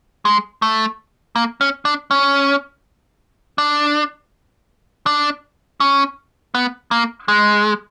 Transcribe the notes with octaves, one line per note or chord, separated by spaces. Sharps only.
G#3
A3
A#3
C#4
D4
C#4
D4
D4
C#4
B3
A#3
G#3